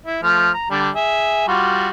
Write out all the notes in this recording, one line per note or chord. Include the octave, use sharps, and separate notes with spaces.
E4
F3 A3 F6
A#5
D3 G3 D4
G#4 E5
G3 F4 F#4